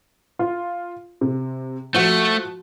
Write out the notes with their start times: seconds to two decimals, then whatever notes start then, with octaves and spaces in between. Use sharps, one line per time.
0.39 F4
1.21 C3
1.94 F3 A3 F#4